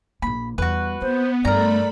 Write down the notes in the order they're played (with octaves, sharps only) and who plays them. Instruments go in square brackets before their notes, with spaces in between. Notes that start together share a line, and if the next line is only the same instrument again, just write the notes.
[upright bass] A#1 A#3 [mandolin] B5
[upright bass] E2 G3 [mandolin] F#4 B4
[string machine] B3 [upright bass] C4 [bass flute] C5
[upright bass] G2 [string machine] A3 B5 [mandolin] A#4 A#5 [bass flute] D5